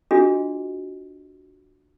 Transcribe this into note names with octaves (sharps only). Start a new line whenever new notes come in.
D4 F4 F#4 G#4 D#5